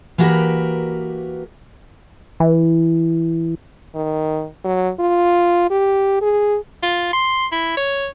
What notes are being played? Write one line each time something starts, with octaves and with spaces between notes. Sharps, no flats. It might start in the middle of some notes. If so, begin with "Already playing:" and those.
E3 A#3 F#4 G4 A#4 B4
E3
D#3
F#3
F4
G4
G#4
F4
C6
E4
C#5